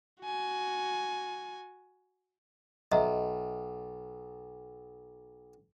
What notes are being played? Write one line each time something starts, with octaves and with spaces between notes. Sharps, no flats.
F#4 G#5
B1 D#5 E5 A#5